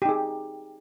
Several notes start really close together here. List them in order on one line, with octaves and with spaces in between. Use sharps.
G4 D#4 G#4